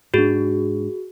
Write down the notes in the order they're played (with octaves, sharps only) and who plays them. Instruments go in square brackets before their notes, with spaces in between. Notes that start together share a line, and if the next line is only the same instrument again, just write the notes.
[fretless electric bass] G#2 D4 [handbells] F#4 G#4